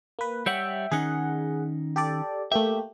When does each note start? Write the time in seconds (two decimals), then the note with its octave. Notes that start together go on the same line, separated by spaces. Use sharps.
0.19 A#3 B4
0.46 G3 C#5 E5 F#5 G5
0.92 D#3 C#4 D#4 G#4 F#5
1.96 G4 A4 D5
2.52 A3 A#3 G4 E5